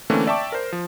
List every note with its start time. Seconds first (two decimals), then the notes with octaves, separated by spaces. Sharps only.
0.10 D3 E3 A3 A#3 C4 C#4
0.27 D5 E5 G5 A5 C#6 D6
0.52 A#4 C5
0.72 F3